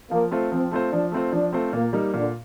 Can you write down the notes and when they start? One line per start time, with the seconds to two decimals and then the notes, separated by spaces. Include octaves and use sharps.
0.11 F3 A#3
0.31 A3 C4 F4 C5
0.52 F3 C4
0.71 A3 C4 F4 C5
0.92 F3 D4
1.12 A3 C4 F4 C5
1.32 F3 D4
1.53 A3 C4 F4 C5
1.73 A#2 A#3
1.93 G3 A#3 D#4
2.14 A#2 D3